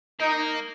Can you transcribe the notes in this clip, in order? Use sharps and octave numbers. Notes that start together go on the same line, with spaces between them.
A#3 D#4